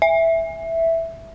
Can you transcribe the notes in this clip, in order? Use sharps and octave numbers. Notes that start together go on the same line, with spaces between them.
E5